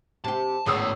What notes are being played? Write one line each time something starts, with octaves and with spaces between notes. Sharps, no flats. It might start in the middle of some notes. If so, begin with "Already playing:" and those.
C3 G4 A5
G#1 E2 A2 C#3 B3 D#6 E6